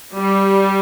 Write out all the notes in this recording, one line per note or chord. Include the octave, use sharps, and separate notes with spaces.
G3